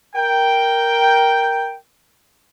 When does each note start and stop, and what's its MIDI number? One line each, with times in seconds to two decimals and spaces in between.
0.15 1.77 70
0.15 1.77 79